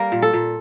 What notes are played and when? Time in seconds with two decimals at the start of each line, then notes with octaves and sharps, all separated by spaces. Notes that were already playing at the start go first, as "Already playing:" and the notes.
Already playing: G3 A#3 A#4
0.12 A#2
0.22 A4
0.33 A#2